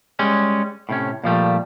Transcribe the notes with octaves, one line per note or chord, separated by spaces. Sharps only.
G3 G#3 C#4
A2 C3 C#4
A#2 F3 G3 A3